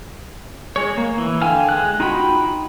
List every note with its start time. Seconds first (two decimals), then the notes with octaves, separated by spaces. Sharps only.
0.76 G#3 C#5
0.98 A#3
1.18 E3
1.41 D3 F5 G5 G#5 F6
1.69 G#3 F#6
2.00 D#4 F4 F#4 G5 B5